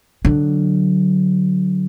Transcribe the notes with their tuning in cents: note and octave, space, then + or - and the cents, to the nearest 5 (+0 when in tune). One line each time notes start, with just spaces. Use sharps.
D3 +0 F#3 +5